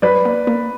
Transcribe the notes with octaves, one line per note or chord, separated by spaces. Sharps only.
F#3 B4 D5
A#3
A#3